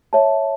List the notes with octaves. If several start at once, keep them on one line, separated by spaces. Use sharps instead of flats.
C#5 E5 A5